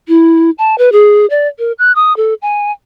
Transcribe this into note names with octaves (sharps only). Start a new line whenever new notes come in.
E4
A5
B4
G#4
D5
A#4
F#6
D#6
A4
G#5